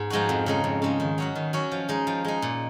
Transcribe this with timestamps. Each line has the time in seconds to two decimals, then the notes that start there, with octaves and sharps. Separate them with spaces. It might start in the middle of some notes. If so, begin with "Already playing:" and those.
Already playing: G#2 B3
0.10 F3 G#3 D#4 F#4
0.29 F2
0.46 C#3 G#3 D#4
0.64 F2
0.82 C#3 G#3 D#4
1.00 D#3
1.18 F#3 C#4 F#4
1.36 D#3
1.53 F#3 C#4 F#4
1.72 F3
1.89 G#3 D#4
2.07 F3
2.25 G#3 D#4
2.42 A#2